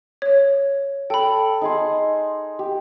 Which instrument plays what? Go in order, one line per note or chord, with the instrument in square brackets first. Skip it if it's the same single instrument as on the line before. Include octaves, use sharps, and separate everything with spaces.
[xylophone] C#5
[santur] A4 [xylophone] G5 B5
[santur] D#4 G#4 C6
G4